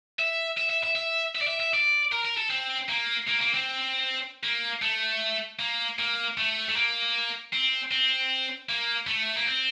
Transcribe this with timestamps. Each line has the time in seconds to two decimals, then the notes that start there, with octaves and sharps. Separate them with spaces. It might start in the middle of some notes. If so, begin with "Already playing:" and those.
0.19 E5
0.58 E5
0.70 E5
0.84 E5
0.95 E5
1.35 E5
1.41 D5
1.47 E5
1.60 E5
1.73 D5
2.12 A#4
2.25 A#4
2.37 A4
2.50 C4
2.89 A#3
3.27 A#3
3.41 A#3
3.54 C4
4.44 A#3
4.82 A3
5.59 A#3
5.99 A#3
6.37 A3
6.69 A3
6.76 A#3
7.53 C4
7.91 C4
8.69 A#3
9.07 A3
9.37 A#3
9.47 C4